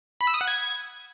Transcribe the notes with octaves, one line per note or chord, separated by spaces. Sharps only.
B5
E6
D#6
F#5
G#6